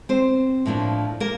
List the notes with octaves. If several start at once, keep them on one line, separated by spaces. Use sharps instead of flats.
C4 C5
A2 F3 A#3 D4
A#3 A#4